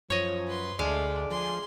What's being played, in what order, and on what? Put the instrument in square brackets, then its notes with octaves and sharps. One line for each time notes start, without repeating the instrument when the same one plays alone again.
[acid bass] F#2 [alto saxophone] F3 [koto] C#5 D#5
[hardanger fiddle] B4 C6
[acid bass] D2 [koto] G#3 F5 [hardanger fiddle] A3 D4 [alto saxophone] D5
[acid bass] F3 [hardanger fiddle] G#4 C6